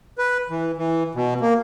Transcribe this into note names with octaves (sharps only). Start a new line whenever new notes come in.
B4
E3
E3
B2
A#3